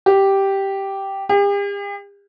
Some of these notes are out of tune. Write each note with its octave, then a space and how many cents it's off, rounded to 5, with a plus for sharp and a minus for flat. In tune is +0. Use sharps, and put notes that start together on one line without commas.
G4 -5
G4 +45